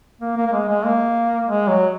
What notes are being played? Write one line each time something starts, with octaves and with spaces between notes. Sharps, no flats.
A#3
A#3
A#3
G#3
G#3
A#3
G#3
F#3